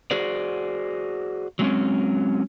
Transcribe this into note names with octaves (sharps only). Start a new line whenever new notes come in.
F#4 G#4 C5 D5
F#3 G#3 C4 C#4